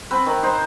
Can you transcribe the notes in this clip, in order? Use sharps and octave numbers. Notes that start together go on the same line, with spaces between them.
C4 B4
D#3
D#4 C5